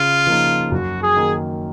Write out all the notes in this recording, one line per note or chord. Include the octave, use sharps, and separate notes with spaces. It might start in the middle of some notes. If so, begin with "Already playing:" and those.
Already playing: C#3 F4
F3 A#3 D#4
F#2 F#4
G#4
D#3 A#3